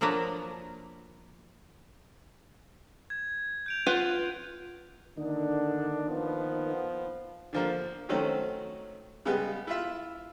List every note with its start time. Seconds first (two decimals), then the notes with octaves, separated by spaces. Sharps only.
0.01 F3 F#3 A#3 D4 A#4 B4
3.10 G#6
3.66 G6 D7 F7
3.86 F4 B4 F#5
5.17 D3 D#3 A#3 D4 D#4
6.09 F3 B3
7.53 D3 F3 A#3
8.09 D#3 F#3 A3 C4 C#4
9.25 C#3 G3 G#3 B3
9.67 E4 F4 E5